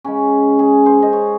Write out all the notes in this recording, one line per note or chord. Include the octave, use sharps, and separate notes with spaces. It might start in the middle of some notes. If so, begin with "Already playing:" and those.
C#3 G#3 C#4
G#4
C5
D#5
C#5